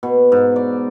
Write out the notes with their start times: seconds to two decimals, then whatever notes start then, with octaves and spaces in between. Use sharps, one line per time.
0.03 B2
0.32 G#2
0.56 D5